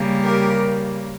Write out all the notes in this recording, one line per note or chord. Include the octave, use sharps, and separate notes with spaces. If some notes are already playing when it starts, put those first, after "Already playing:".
Already playing: C#3 G3 A#3
G4 A#4